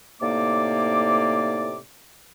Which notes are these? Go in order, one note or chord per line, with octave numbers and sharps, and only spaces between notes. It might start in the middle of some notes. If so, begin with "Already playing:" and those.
A2 C3 A#3 D#4 D5 D6